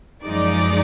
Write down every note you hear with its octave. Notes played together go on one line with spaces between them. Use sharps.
F#2 F3 G#3 D#4 D5 D6